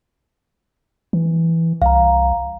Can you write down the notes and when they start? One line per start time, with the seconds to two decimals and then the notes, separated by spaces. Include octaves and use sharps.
1.13 E3
1.82 C2 F5 A#5